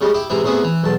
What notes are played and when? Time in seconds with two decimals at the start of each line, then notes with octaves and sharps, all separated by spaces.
0.01 C#3 G3 G#3
0.14 E4 G4 D6
0.30 G#2 C3 E3 E4
0.44 A2 C3 B3 E4 G#4
0.64 E3
0.83 B1 E2 A5